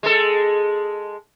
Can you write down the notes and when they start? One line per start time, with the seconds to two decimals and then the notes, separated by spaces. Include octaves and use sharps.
0.03 G#3 A4